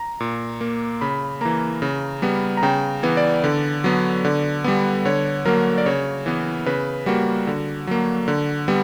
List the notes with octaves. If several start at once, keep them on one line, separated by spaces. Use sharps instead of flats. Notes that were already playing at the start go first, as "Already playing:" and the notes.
Already playing: A#5
A#2
A#3
C#3 B5
E3 A#3 A#5
C#3
G3 B3
A#5
C#3 G5
E3 B3
D5
D3
F#3 B3
D3
G3 B3
D3 C#5
F#3 A#3 A#4
D5
C#3 C#5
E3 B3
C#3 B4
G3 A#3 F#4
D3
F#3 A#3
D3
G3 B3